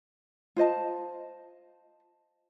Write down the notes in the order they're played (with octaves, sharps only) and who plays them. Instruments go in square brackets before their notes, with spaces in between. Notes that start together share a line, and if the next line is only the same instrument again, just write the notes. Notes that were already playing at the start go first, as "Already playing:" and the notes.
[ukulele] F4 C5 D#5 A5